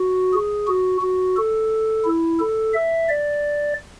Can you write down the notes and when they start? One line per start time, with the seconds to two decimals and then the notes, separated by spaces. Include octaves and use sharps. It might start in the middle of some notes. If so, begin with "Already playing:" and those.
Already playing: F#4
0.33 G#4
0.67 F#4
1.01 F#4
1.37 A4
2.05 E4
2.40 A4
2.74 E5
3.09 D5